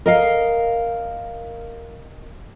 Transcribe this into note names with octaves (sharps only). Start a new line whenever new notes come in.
A#4 D#5 F5